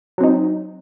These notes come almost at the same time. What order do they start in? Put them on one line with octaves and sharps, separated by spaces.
F#3 C4 D#4